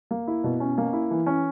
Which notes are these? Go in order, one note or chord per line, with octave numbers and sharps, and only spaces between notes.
A#3
E4
B2
C#4
A#3
E4
E3
C#4